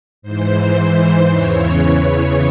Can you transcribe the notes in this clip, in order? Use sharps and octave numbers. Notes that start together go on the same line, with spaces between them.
G#2 E3 C5
E2 C#3 E3 C#5